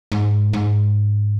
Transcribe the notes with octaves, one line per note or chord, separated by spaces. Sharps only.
G#2
G#2